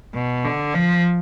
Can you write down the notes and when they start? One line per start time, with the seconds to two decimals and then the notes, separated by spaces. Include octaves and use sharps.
0.14 B2
0.44 D3
0.74 F3